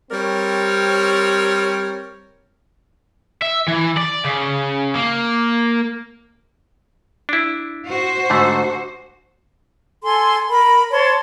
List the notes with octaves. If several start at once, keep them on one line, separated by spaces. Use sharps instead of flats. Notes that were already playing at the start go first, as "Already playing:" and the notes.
G3 C4 A#4 C#5
E5
E3
D5
C#3
A#3
D4 E4
F#4 C5
G#2 D3 A3
A4 G#5 C6
A#4 B5
C5 C#5 A5 C6